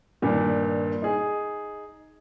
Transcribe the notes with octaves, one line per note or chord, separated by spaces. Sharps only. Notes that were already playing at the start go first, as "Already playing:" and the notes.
G2 A#2 D#3
D#4 G#4